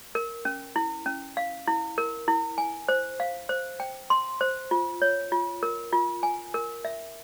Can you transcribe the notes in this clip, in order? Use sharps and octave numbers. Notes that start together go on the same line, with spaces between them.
A#4
C#4
E4
C#4
F5
E4
A#4
E4
G#5
C5
F5
C5
G5
C6
C5
F4
C#5
F4
A#4
F4
G#5
A#4
E5